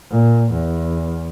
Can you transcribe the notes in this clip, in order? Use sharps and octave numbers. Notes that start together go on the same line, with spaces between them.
A#2
E2